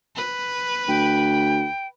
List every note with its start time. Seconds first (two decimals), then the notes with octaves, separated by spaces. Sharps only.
0.16 B4
0.88 D2 G5